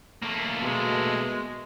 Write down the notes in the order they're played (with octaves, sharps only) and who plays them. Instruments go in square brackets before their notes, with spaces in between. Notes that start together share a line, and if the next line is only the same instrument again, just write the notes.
[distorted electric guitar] A3 A#3
[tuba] B2 [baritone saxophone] G#3